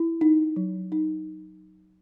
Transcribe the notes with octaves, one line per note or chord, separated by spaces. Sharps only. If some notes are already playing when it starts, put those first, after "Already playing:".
Already playing: E4
D#4
F#3
D#4